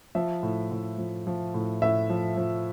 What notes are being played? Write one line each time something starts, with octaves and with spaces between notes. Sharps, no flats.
F3 E5
A2
A2
F3
F3
A2
A2 E5
F3
F3